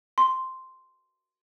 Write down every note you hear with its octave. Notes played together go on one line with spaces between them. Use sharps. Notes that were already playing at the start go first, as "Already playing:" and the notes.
C6